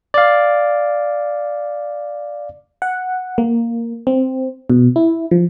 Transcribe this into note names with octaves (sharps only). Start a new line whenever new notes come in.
D5 F5
F#5
A#3
C4
B2
E4
F3